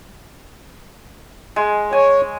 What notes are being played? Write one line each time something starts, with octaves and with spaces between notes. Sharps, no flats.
G#3
C#5 G#5